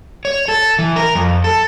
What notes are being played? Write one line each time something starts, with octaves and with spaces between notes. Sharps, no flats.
C#5
A4
E3
A#4
F2
A4